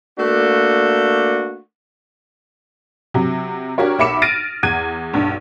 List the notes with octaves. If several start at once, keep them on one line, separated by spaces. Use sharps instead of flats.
A3 A#3 D4 F#4
C3 F#3
D4 F#4 G4 A#4 C#5
B1 E5 B5 D6 C#7 E7
F6 A6 A#6 D7 D#7
E2 G#6 D#7
B1 G2